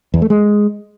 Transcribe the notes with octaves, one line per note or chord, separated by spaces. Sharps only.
E2
A3
G#3